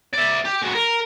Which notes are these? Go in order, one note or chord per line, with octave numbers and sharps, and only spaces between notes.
D5 E5
G4
G#3 F#4
A#4